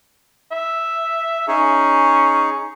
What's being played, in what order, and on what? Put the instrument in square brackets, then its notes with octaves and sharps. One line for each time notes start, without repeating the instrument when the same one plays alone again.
[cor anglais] E5
[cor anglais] C#4 [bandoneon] D#4 G#4